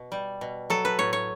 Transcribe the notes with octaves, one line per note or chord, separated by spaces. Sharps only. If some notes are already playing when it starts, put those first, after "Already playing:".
Already playing: B2
G3
B2
F#3 A4
B4
A2 C#5
C#5